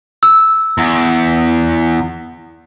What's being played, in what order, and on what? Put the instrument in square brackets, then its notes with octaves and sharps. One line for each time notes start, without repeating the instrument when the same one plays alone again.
[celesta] E6
[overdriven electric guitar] E2